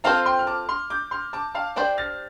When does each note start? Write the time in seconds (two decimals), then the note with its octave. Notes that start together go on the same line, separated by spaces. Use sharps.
0.04 C4 F4 A4 C5 F5 A5
0.26 G5 C6
0.39 F6
0.47 A5 D6
0.69 C6 F6
0.90 D6 G6
1.11 C6 F6
1.33 A5 D6
1.55 F5 A5
1.76 D4 G4 C5 D5 G5
1.98 F6 A6